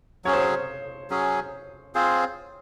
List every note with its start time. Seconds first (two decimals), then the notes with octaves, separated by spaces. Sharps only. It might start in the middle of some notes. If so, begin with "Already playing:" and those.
0.25 F#3 C#4 G#4 C#5
0.33 C5
0.42 C#5
1.10 F#3 C#4 G#4
1.95 C4 F4 G#4 C5